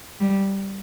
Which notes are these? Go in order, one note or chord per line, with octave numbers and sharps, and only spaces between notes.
G3